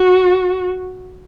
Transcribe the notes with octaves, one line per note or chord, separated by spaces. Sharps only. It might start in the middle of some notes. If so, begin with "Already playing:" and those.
Already playing: F#4